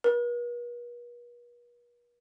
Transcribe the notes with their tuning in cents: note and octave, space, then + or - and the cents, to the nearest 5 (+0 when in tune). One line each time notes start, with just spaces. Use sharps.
B4 -45